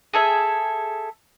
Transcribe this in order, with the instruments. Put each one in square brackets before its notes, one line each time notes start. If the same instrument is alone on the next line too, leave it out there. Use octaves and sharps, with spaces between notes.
[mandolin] G#4 A4 E5